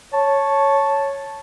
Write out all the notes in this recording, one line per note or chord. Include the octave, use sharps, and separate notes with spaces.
C#5 A5